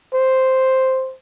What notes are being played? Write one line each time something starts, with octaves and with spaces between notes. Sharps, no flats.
C5